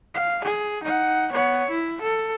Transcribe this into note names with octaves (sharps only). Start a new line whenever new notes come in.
F5
G#4
D#4 F#5
B3 C#5
E4
A4